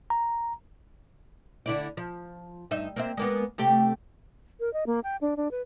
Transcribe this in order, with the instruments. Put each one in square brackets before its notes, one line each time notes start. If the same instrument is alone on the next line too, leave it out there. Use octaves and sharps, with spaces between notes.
[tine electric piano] A#5
[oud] D3 E4 D5
F3
G2 D#4 E5
A#3 C4 E5
G#3 A#3 B3
C3 A3 G4
[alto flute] A#4
D#5
A#3
G5
D4
D4
B4